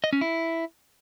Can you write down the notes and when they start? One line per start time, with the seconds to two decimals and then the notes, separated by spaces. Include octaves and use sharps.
0.04 D#5
0.13 C#4
0.21 E4